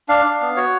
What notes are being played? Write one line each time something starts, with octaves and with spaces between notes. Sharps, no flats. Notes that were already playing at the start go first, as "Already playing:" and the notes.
D4 F5
D4
B3
F#4 C#5